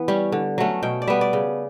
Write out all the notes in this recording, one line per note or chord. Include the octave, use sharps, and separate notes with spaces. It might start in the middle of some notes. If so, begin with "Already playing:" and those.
Already playing: E3 B3
G3 C#4
D3
F#3 A3 C#4
B2 G5
D5
G3 B3 E5
D5
C#3